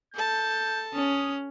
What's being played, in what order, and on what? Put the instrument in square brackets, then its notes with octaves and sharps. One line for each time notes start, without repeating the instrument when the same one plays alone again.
[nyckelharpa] A4 A5 [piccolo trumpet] G6
[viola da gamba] C#4 [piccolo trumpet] D#6